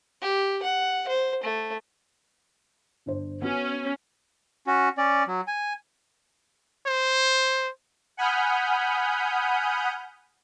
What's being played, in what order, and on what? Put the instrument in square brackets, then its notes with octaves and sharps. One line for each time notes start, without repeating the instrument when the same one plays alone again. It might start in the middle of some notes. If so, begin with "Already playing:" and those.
[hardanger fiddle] G4
F#5
C5
A3
[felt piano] G1 D4 C5
[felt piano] B3 F#4 [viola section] C#4
[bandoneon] C#4 F#4
C#4 D5
F#3
G#5
[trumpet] C5
[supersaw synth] F#5 G#5 B5 D#6 F6 G6